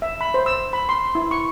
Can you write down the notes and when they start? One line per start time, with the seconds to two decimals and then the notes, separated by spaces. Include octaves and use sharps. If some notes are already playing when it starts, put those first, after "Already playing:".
0.02 E5
0.21 B5
0.34 C5
0.46 E6
0.73 B5
0.89 C6
1.15 E4
1.31 C#6